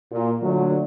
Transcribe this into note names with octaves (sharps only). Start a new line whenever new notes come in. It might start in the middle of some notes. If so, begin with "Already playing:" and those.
A#2 F4
D3 F#3 A3